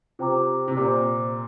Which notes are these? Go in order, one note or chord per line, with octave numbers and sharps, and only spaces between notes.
C3 F4 C5 G5 A#5 D6
C3
A#2 C5 A#5 D6